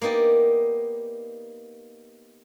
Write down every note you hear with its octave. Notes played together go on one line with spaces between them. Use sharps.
A#3 B3 D#4 G4 D5